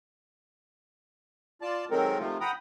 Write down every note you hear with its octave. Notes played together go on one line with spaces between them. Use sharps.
F4 D5 A5
D#3 F#3 G#3 C4 A4 A#4
C3 D#3 F3 A3 F4
F#5 G5 A#5 B5 D#6